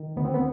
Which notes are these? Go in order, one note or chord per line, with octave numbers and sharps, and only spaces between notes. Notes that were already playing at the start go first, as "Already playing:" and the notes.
Already playing: D#3
D2 B3
C4
B3